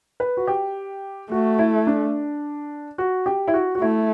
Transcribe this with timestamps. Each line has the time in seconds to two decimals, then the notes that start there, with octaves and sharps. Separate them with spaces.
0.20 B4
0.37 F#4
0.47 G4
1.31 A3 F#4
1.59 E4
1.87 D4
2.98 F#4
3.26 G4
3.48 E4
3.54 F#4
3.75 F#4
3.81 A3 E4